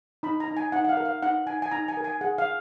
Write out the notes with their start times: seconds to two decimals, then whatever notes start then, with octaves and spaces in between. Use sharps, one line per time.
0.23 D#4 B5
0.40 A#5
0.48 D#4
0.57 G#5
0.72 D#4 F#5
0.85 F#5
0.89 F5
0.97 A#4
1.05 F5
1.23 D#4 F#5
1.47 D#4 G#5
1.62 G#5
1.72 D#4 A#5
1.88 G#5
1.97 A#4
2.04 G#5
2.21 G#4 F#5
2.38 F5